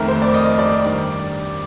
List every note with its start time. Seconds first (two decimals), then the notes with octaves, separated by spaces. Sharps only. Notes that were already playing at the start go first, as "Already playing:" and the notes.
Already playing: F2 D#3 A3 A#4
0.08 C5
0.22 D5
0.34 D#5
0.59 D5
0.84 G2 D#3 G3